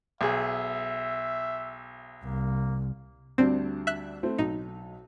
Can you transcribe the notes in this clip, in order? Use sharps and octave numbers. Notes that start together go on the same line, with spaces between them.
B1 G#4 E5
C2 A#3
D2 G3 C4 D4
E5 F#6
A3 C4 E4
B1 D#4